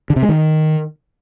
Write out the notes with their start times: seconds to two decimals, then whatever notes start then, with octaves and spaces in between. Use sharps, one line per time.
0.10 D3
0.16 C3
0.23 G#3
0.29 D#3